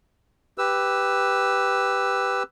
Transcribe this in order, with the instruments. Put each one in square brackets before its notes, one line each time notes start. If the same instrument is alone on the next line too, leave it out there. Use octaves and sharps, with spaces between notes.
[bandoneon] G4 B4 E6